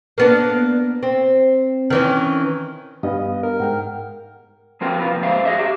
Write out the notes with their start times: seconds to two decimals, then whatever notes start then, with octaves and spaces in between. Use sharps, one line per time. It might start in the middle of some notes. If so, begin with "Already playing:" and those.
0.18 A#3 B3 D4
1.03 C4
1.90 D#3 E3 C#4
3.03 G2 G3 B3 D#5 F5
3.43 A#4
3.60 G#2 F#5 G5 F6
4.81 F3 B3 C4 F4 A#4 G5
5.00 C3 F4 B4
5.11 D#2 F3
5.23 G#2 G#4 C5 E5 F5
5.45 F#4 G#4 B4 C#5 D#5 E5
5.58 G4 E5